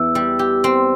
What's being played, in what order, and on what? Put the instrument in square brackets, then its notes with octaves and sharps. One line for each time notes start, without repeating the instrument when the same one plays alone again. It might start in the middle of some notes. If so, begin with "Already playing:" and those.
Already playing: [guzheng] E2 E3 [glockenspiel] E6
[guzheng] G3
G4
C4